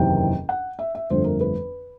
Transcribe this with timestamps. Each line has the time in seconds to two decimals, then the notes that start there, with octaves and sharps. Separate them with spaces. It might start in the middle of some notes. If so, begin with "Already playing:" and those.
Already playing: F#1 E2 C3 D#3 G5
0.49 F#5
0.79 E5
0.95 E5
1.10 G1 F2 D3 F3 A3 C5
1.24 A#4
1.41 B4